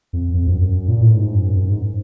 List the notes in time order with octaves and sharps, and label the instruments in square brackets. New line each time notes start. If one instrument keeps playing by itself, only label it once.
[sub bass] F2
F2
F#2
F#2
A#2
A2
G#2
F#2
F#2
G#2